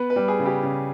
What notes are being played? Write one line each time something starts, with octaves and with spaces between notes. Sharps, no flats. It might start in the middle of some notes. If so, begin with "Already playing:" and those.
Already playing: B3 B4
B4
G3
G#4
C#3
G4
C#3